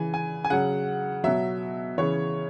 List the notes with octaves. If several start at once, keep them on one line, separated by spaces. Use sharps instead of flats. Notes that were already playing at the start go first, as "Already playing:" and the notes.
Already playing: C#3 E3 G#5
G#5
G#5
C#3 F#3 F#5
B2 F#3 E5
C#3 E3 C#5